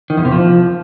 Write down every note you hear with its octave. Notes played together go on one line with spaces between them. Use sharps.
D#3
E2
C3
F3